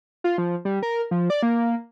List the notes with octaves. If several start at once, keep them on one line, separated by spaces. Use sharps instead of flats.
F4
F3
G3
A#4
F3
D5
A#3